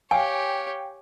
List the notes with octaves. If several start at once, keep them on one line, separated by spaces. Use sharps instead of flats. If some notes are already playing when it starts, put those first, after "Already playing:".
G4 C#5 F5 G5 G#5